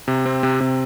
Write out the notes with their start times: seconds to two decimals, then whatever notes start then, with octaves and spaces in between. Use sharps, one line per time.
0.08 C3
0.26 C4
0.43 C3
0.61 C3